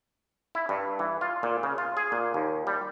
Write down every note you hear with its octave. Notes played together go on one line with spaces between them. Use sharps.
E4
G2
E3
F4
A#2
C#3
F4
G#4
A#2
D#2
G3